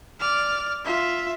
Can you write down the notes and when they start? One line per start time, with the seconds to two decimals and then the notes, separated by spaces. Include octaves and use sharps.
0.20 D5 F6
0.85 F4 E5